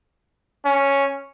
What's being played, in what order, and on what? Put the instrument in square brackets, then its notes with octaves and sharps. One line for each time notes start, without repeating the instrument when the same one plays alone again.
[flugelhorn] C#4